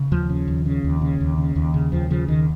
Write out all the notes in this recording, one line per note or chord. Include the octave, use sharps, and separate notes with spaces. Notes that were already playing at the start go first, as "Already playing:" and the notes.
Already playing: C#3
D#2 F3
C#3
D#2
C#3
D#2
C#3
D#2
C#3
D#2
C#3
D#2 F3
C#3 F3
D#2 D#3